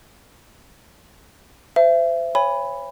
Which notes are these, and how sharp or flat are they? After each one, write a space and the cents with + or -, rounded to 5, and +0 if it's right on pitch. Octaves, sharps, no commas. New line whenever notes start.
C5 -30 E5 +30
C#5 +0 G#5 -35 B5 +0